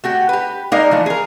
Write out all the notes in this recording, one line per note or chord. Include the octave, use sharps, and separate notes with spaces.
A3 F#4 G4
G4 B4
G#3 A#3 D#4 A#4 D5 F5
E3 F3 A3
G#4 A#4